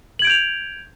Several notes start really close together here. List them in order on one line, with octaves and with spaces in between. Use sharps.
F#7 G#6 D7 G6 F7